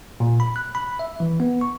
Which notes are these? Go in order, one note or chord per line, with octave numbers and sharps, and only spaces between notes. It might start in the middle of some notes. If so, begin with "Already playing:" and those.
A#2
B5
F#6
B5
E5
E3
B3
C#6